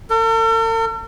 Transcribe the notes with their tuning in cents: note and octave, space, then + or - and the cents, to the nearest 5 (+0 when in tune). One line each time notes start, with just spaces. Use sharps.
A4 +45